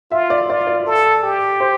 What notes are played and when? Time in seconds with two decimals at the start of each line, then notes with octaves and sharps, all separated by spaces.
0.11 F4 E5
0.30 D5
0.49 F4 D5
0.67 D5
0.86 A4
1.23 G4
1.60 C5